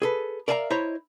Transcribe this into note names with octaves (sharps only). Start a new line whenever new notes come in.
G#4 A4 B4
A#4 D5 E5 F5 G#5 A#5
E4 C5 C#5 D#5 A#5